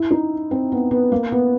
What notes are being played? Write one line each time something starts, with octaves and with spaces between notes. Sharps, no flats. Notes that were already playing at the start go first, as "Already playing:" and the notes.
Already playing: E4
D#4
C4
B3
B3
A#3
B3